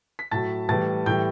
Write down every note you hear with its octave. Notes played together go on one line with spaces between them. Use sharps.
B6
A2 F#3 A5 A6
A2 E3 G3 A5 A6
A2 E3 G3 G5 G6